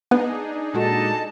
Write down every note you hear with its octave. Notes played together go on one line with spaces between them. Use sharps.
B3 D4 D#4 G#4 B4
A#2 G#3 F#4 A4 D#5 A5